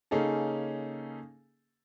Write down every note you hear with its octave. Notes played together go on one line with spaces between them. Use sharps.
C#3 A#3 C#4 D#4 G#4 A4